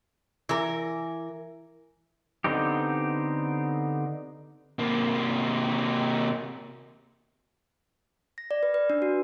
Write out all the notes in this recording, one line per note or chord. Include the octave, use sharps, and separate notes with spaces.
E3 A#4
D3 B3 C4 D#4 G4
C3 A#3
A#6
D5
B4
B4
D4
F#4